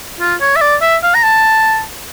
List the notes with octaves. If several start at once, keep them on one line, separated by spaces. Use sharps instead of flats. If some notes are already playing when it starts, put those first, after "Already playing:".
F4
C#5
E5
D5
E5
F5
A#5
A5